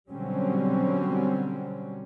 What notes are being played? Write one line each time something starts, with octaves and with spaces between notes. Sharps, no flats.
B2 D3 F#3 G3 C4 C#4